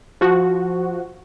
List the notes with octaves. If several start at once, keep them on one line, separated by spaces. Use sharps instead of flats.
F3 F#4